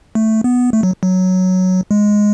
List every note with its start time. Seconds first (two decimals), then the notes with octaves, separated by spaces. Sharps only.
0.15 A3
0.44 B3
0.73 A3
0.83 F#3
1.03 F#3
1.91 G#3